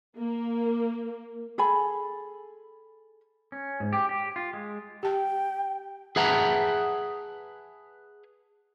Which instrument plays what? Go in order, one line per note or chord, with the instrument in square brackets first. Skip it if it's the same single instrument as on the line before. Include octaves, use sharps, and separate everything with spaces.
[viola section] A#3
[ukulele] G#4 A4 G#5 B5
[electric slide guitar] C#4
G#2
G4
G4
F4
G#3
[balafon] G4 A5 [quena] G5
[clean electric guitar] G#4 B4 E5 F#5 A5 A#5